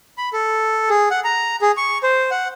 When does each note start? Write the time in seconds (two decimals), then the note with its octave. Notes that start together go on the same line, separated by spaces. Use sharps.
0.18 B5
0.33 A4
0.90 G#4
1.11 F#5
1.24 A#5
1.62 G#4
1.77 C#6
2.03 C5
2.31 F#5